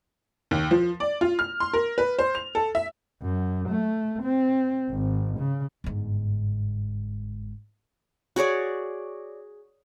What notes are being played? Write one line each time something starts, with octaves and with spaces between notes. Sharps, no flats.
D#2
F3
D5
F4
F6
C6
A#4
B4
C5
F7
A4
E5
F#2
A3
C4
G#1
C#3
G1 G#2
F#4 G#4 C#5 D5